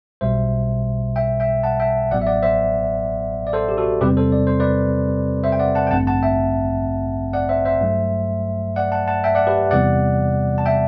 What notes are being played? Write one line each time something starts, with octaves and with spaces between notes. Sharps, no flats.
B1 B2 G3 C5 E5
E5 G5
E5 G5
F#5 A5
E5 G5
A1 A2 F#3 B3 D5 F#5
E5
D5 F#5
C5 E5
D5
A4 C5
G4
F#4 A4
E2 C3 G3 C4 G4 B4
A4 C5
D5
C5
B4 D5
C5 E5
G5
D5 F#5
F#5 A5
G5
A1 G2 D3 A3 C4 F#5 A5
F#5 A5
E5 G5
D5 F#5
C5 E5
C5 E5
G2 F#3 A3
D5 F#5
F#5 A5
F#5 A5
E5 G5
D5 F#5
G4 B4
E2 C3 E3 G3 B3 D5 F#5
A5
E5 G5